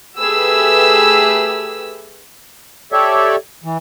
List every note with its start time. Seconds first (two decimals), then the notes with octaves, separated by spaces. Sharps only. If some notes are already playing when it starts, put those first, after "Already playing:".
0.19 A3 G4 G#4 B4 E6
2.92 G4 A4 C#5 D5 E5
3.64 E3